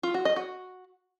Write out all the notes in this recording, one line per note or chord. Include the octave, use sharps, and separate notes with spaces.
F4
F#4
D#5
F#4